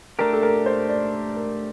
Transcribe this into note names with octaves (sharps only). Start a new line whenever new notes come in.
A3 D4 G4 A#4
A4
A#4
C5
D5
A#4